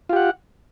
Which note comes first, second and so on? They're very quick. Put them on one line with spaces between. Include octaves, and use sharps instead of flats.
F4 G4 F#5